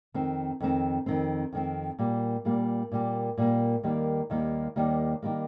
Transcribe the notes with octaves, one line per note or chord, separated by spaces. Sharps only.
F2 D#3 C4
F2 D#3 C4
F2 D#3 C4
F2 D#3 C4
A#2 G3 A#3
A#2 G3 A#3
A#2 G3 A#3
A#2 G3 A#3
D#2 D#3 G3 A#3
D#2 D#3 G3 A#3
D#2 D#3 G3 A#3
D#3 G3 A#3